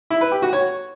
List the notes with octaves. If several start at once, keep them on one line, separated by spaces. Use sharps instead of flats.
E4
B4
G4
F#4
C#5